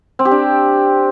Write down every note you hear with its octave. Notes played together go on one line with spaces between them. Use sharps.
C4
G4
D4